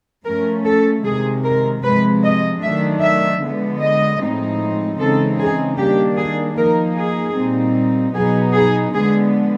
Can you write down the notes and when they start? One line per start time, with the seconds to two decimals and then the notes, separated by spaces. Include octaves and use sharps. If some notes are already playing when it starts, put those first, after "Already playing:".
0.24 F3 A3 C#4 A#4
0.65 A4
1.04 C3 D#3 G#3 G#4
1.43 A#4
1.83 C3 F3 G#3 B4
2.23 D#5
2.62 D#3 F#3 A3 D4 E5
3.02 E5
3.41 D3 F3 G#3 B3
3.80 D#5
4.20 A2 F3 G#3 C4 D#4
4.99 C#3 E3 G#3 C4 D#4 A4
5.38 G#4
5.78 D#3 G3 A#3 D4 G4
6.17 G#4
6.57 F3 A#3 D#4 A#4
6.96 G#4
7.35 A#2 G3 C4 D#4
8.15 B2 F#3 B3 D#4 G#4
8.54 G#4
8.94 D3 F3 G#3 B3 G#4